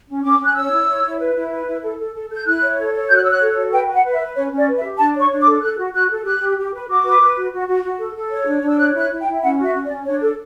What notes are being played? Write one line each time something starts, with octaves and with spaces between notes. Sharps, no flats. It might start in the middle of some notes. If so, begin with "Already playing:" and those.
C#4
C#4 D6
C#4
F#6
C#5 E6
E4
C#5
E4
B4
E4
B4
E4
A4
A4
A4
A4 G6
E4 F#6
C#5
A4
C#5
F#4 G6
F#6
C#5 E6
F#6
A4
F#4
B4 G5
B4
F#5
B4
E5
B4
C#4 C#5
C#4
D5
B4
E5
G4
D4 A5
C#5
C#6
D4
D6
A4
A4 F#6
F#4
F#4 F#6
A4
G4 F#6
G4
G4
B4
F#4 D6
B4
B4
F#4
F#4
F#4
F#4
A4
A4
C#5
D4
D4
E6
C#5 F#6
E4
F#6
E4
G5
E4
C#4 F#5
F#4 E5
C#4
D5
C#4
D4 C#5
A4